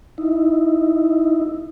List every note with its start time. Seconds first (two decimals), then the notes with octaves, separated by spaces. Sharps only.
0.18 D#4 E4